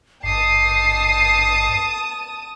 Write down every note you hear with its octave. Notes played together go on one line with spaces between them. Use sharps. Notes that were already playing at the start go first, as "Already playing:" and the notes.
G#1 G2 A5 D#6 C7